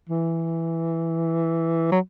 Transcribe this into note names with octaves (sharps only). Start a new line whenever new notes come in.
E3
F#3